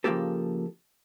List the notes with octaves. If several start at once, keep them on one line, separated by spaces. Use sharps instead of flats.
C#3 F3 G#3 A#3 G4 A4